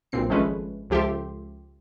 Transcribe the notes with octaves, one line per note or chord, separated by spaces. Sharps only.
B1 G2 A#2 C4 C7
G#1 F3 G#3 A3 C#4 B4
C#2 F3 G4 A4 E5 C6